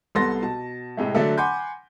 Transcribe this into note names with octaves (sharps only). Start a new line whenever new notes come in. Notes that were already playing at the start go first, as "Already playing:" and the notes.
C2 B3 A4 C6 A6 A#6
B2 A5
A2 C3 G#3 A3
D3 F#3 A3 D4 A4
F#5 G#5 B5 C6 D6 G6